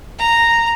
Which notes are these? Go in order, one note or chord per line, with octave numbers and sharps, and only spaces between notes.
A#5